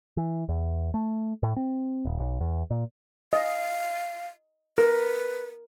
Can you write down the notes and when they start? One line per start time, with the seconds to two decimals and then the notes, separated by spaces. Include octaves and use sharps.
0.17 E3
0.49 E2
0.94 A3
1.43 A2
1.56 C4
2.05 D#1
2.20 B1
2.41 E2
2.70 A#2
3.33 D#5 F5
4.78 A#4 B4